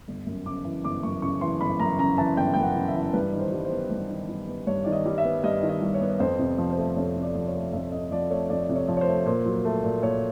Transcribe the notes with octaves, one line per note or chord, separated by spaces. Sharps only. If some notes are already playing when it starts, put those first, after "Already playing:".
G1
F#2
C#3 D6
E3
G1 D6
F#2 C#6
C#3 C#6
E3 C6
G1 B5
F#2 A#5
C#3 A#5
E3 A5
G1 G5
F#2 G5
F#5
C#3
E5
E3
G2 B4
D#3
C5
G3
C5
B3
G2
D#3
G3
B3
G2 C#5
D#3 D5
D#5
G3
E5
B3
G2 D#5
D#3
D#5
G3
C#5
B3
C#5
F2 C5
C3
F3
C5
A3
F2 C#5
C3
D5
F3 D5
C#5
A3
F2 E5
C3 D#5
F3 D5
A3 C#5
F2 D5
C3
C#5
F3
C#5
C5
A3
A#2 C5
F#3
A3
A#2
A#2 C#5